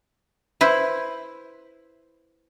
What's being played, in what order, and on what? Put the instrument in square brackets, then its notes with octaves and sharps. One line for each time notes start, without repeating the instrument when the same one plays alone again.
[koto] E4 B4 C5